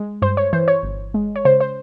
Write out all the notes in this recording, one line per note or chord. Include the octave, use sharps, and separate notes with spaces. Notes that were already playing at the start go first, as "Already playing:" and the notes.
Already playing: G#3
G2 C5
C#5
E3 C5
C#5
G1
G#3
C#5
C#3 C5
C5